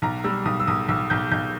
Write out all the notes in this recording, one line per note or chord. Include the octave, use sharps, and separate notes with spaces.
B1 A#5
G3 E6
B1 D#6
E6
B1 D#6
B1 E6
B1 G6
B1 G6